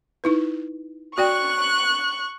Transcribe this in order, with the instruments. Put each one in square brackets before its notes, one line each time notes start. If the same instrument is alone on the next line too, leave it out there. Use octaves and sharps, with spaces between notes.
[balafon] D#4 E4 B4
[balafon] F#4 D5 G5 [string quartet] C#6 F#6